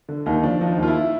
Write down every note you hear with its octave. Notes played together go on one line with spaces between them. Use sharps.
D3
D#2 D#4
F3 D4
F3 D#4
D#2 F4
E4